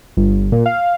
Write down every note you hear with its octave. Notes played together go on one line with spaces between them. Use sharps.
G1
A#2
F5